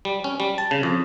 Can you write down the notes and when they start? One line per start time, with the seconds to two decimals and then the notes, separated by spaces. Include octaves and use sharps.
0.05 G3
0.24 C#4
0.40 G3
0.58 A5
0.71 C#3
0.83 F2